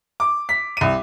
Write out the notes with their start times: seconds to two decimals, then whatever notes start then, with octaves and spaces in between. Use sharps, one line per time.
0.20 D6
0.49 B6
0.77 C2 D#7